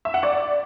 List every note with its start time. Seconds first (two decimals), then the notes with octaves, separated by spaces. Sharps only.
0.05 E5
0.14 F#5
0.23 D5